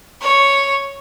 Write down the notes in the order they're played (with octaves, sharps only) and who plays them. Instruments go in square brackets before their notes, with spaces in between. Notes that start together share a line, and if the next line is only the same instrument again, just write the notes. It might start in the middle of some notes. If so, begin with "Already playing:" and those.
[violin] C#5